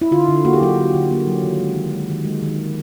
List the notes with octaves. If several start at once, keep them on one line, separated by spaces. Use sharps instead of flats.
E4
D3 F4
D3
A#3 F#4
G4
F#3 F#4
D3
D3
A#3
F#3
D#3
G#3
D#3
G#3
D#3
G#3
D#3
G#3